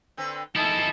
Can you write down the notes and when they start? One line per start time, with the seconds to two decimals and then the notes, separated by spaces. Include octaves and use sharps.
0.17 D3 C4 B4
0.56 A3 D#4 E4 G#4 A5